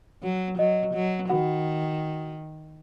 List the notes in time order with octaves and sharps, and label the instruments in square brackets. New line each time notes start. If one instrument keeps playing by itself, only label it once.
[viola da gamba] F#3
[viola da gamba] F#3 [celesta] D#5
[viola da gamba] F#3
[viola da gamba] D#3 [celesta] F#4 F#5